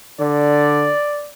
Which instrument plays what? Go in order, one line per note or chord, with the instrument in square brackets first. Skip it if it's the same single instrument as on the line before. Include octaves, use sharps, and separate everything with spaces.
[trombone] D3 [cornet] D5